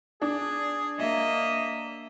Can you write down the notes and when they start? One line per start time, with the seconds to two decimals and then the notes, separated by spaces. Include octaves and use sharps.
0.21 D4 G#4
0.99 A#3 D#5 E5